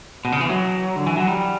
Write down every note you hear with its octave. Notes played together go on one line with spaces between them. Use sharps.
B2
C#3
E3
F#3
D3
E3
F#3
G3